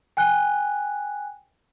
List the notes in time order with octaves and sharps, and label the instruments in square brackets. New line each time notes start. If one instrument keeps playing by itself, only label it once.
[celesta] G5 G#5 F#6